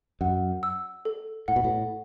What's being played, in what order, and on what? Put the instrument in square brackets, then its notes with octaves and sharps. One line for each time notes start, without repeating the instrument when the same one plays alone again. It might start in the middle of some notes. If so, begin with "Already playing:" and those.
[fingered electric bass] F#2 [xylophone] F#5
[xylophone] E6
A4
[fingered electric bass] A2 [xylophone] F#5
[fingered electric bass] B2
A2